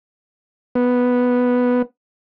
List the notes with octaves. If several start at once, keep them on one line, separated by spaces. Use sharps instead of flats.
B3